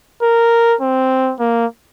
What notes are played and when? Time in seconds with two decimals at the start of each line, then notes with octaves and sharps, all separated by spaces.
0.23 A#4
0.81 C4
1.39 A#3